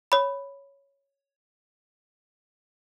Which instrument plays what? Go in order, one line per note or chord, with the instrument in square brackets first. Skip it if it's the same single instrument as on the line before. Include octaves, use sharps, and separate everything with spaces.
[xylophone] C#5 B5